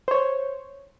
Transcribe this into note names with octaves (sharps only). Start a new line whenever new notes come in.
C5 C#5